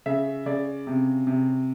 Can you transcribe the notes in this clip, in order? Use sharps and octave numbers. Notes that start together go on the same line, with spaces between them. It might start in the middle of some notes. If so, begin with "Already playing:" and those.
C#3 E5
C#3 D5
C3
C3